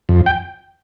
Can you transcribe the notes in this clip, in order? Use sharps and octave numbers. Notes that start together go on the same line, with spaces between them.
F2
G5